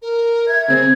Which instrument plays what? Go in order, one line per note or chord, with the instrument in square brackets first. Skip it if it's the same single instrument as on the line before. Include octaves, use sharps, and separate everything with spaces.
[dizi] A#4
[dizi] E5 [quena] G#6
[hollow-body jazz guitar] C#3 C4 [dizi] G#4